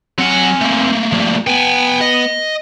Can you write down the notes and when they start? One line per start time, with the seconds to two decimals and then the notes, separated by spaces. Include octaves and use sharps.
0.18 F#3 C4 F#5 G#5
0.61 A3 A#3
1.13 F3 G3
1.47 B3 G5 G#5
2.01 D#5